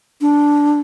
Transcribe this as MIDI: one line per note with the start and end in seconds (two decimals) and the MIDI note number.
0.21 0.80 62